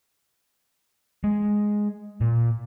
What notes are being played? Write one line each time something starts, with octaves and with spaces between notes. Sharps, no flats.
G#3
A#2